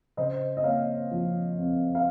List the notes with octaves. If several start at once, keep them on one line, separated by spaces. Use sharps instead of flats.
C#3 C5 D#5
D#5
A#3 C#5 F5
F3
F2
F5